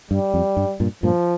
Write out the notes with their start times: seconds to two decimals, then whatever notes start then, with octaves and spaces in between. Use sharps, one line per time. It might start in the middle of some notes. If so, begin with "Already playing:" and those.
0.11 G2 G3
0.34 F2
0.57 G2
0.80 G2 A#2
1.03 G2 A#2 F3